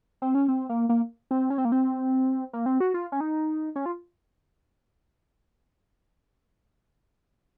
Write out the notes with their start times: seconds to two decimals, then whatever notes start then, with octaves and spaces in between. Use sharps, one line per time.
0.22 C4
0.35 C#4
0.48 C4
0.69 A#3
0.89 A#3
1.31 C4
1.50 C#4
1.58 C4
1.65 A#3
1.72 C4
2.53 A#3
2.66 C4
2.80 F#4
2.94 F4
3.12 C#4
3.20 D#4
3.76 C#4
3.86 F4